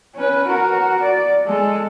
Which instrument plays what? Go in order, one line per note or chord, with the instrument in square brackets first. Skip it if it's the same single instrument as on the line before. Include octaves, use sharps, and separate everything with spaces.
[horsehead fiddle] C#4 B4
F#4 A#4
D5
G#3 A4